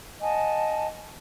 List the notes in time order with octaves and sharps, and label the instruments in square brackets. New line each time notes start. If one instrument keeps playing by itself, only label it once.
[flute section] D#5 F#5 G#5 A5